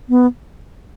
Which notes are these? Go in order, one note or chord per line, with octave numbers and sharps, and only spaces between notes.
B3